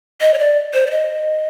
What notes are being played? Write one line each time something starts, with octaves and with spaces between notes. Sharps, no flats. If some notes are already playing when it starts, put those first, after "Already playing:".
D#5
C#5
D5
C5
D5
D#5